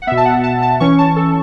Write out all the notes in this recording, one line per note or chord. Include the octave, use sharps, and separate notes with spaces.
F#5
B2 B3 E5
A5
F#5
A5
A5
E3 C#4 C#6
A5
A4